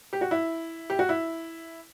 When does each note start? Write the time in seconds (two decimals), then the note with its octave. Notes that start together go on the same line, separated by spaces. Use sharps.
0.13 G4
0.21 F#4
0.31 E4
0.90 G4
0.99 F#4
1.09 E4